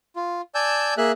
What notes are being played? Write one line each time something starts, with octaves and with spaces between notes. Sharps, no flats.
F4
D5 G#5 A5 E6 G6
A#3 G#4 E5 F#6